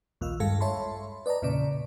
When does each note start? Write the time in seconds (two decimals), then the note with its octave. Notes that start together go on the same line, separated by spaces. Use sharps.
0.21 A#1 D#2 F4 F5 E6
0.40 G2 G#3 A4 F5 C#7
0.61 C#5 E5 A5 B5 C6
1.26 B4 D5 D#5 A5 A#5
1.42 E2 A#2 C#3 D5